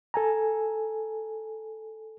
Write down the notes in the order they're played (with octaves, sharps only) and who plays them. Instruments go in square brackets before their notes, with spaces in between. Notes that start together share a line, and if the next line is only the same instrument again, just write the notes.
[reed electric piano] A4 G#5 A#5